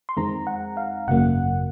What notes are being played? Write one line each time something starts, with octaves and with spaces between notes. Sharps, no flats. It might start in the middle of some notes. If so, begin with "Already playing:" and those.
C6
F2 D#3 G#3 C4 A#5
F#5
F5
G#1 F#2 C#3 F#3 A#3 F#5